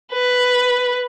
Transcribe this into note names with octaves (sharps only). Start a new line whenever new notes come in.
B4